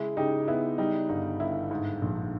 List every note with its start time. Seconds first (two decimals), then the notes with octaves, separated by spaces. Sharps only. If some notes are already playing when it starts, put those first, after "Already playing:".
Already playing: C#3 G#3 E4
0.17 C#3 D#4 G4
0.48 B3 E4
0.78 G3 D#4
1.09 G1 D#4
1.40 G1 E4
1.71 G#2
2.02 A#1